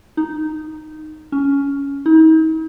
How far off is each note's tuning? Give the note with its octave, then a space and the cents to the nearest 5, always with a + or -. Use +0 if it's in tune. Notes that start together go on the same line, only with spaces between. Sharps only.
D#4 -5
C#4 +15
D#4 +45